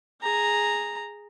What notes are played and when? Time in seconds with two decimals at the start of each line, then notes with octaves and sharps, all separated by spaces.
0.22 G#4 A#5